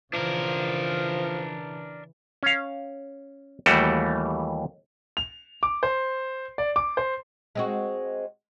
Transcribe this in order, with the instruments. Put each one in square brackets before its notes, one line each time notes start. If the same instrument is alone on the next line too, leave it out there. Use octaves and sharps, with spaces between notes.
[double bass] C#3 E3 [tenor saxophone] F3 [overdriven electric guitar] D4 A#4
[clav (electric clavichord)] C#4 F5
D#2 E3 G3 A3 F#4 G5
[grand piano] F7
D6
C5
D5
D6
C5
[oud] G#3 C4 F#4